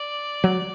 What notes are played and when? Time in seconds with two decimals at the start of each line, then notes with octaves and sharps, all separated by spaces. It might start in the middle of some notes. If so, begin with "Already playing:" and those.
Already playing: D5
0.44 F#3